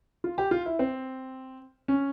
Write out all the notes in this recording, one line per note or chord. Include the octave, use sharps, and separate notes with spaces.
F4
G4
F4
E4
C4
C#4